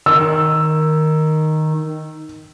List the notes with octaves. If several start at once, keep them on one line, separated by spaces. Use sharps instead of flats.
D#3 E6